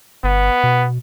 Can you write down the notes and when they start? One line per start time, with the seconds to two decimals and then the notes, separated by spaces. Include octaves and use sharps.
0.24 G1 B3
0.64 B2